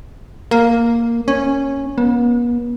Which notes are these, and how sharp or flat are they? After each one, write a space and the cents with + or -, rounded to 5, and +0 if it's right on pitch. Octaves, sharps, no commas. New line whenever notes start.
A#3 +0
C#4 -10
B3 -45